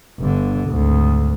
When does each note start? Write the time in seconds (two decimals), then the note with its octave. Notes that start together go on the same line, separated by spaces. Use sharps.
0.19 G1 D3
0.69 G#1 D2